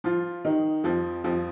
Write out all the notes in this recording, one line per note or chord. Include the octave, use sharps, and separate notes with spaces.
F3 F4
D#3 D#4
F2 F3
F2 F3